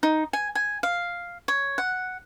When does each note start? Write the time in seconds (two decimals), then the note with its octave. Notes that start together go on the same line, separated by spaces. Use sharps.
0.03 D#4
0.33 G#5
0.55 G#5
0.83 F5
1.48 C#5
1.78 F#5